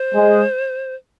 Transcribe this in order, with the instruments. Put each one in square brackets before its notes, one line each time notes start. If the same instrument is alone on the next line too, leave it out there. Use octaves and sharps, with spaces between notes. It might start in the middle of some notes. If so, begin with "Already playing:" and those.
Already playing: [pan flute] C5
[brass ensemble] G#3